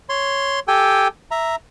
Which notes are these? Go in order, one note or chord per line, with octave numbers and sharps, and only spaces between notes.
C#5 C6
G4 A4 G5 G#5
E5 A#5